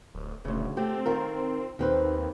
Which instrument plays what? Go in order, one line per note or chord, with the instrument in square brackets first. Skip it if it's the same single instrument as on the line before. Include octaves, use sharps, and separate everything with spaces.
[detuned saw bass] D1
[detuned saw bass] D#1 [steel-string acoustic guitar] D2 C#3
[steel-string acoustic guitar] A3 G4 [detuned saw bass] C4
[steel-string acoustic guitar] D#3 F4 A#4
[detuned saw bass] D#2 [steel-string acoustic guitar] D#3 C4 B4